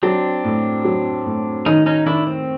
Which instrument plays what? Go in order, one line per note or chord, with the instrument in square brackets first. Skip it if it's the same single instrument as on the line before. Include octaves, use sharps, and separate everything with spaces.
[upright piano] F#3 [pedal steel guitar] C4 D4
[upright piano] A2
F#3
A2
[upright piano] D#3 [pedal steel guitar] C#4 D#4
[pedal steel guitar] C#4 D#4
[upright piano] D#3 [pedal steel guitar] D4 E4
[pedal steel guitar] C4